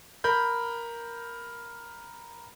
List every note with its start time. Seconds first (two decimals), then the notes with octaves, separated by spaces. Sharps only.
0.24 A#4 B5 G6